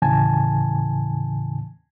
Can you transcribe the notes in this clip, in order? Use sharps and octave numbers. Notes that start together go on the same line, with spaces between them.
D#2 A2 C#3 E3 G#5 A5